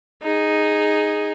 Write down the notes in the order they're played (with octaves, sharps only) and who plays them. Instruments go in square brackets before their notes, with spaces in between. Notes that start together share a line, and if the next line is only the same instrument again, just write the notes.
[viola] D#4 G#4